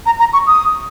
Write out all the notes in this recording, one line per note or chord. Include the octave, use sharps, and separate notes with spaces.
A#5
A#5
C#6
D#6